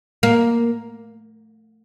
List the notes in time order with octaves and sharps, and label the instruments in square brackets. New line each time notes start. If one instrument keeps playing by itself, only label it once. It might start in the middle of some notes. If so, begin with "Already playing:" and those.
[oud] A#3